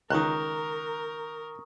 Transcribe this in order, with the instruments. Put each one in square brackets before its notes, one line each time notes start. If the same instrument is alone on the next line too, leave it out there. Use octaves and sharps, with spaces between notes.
[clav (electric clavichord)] C#2 [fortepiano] D#3 F#6 [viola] A#4 [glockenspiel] A#5 C#6 D#6